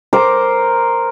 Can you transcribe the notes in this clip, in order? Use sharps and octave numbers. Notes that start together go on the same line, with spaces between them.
A#4 C5 D6